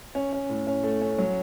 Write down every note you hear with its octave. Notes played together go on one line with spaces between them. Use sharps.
C#4
C#4
A2
C#4
A3
C#4
F#3